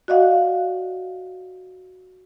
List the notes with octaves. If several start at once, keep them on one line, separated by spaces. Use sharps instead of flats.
F#4 D5 D#5 F5 F#5